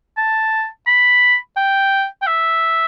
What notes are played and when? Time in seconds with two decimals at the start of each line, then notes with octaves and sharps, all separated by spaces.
0.17 A5
0.87 B5
1.57 G5
2.22 G5
2.27 E5